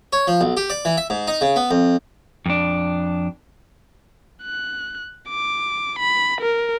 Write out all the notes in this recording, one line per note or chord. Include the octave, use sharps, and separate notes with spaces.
C#5
F3
B1
G4
D5
E3
E5
G#2
D#4
C#3
B3
F2
F2 D4
F#6
D6
B5
A#4